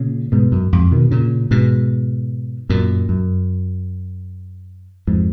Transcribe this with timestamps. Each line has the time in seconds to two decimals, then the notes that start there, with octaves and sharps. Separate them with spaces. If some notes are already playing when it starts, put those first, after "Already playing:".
Already playing: A#2 C#3
0.32 G#2 B2
0.52 F#2
0.73 F2 G#2
0.91 B2 D#3
1.11 A#2 C#3
1.51 G#2 B2
2.70 F#2 A#2
3.09 F#2
5.07 F2 G#2